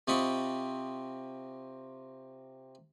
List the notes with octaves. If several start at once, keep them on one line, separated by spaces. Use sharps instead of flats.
C3 C4 F4 D#5 B5 C#6